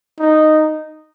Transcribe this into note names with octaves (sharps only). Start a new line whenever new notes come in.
D#4